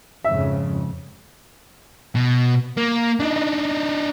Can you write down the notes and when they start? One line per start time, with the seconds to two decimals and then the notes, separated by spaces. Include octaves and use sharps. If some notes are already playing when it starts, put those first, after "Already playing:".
0.24 F2 G#2 C#3 E5
2.15 B2
2.77 A#3
3.20 D4 D#4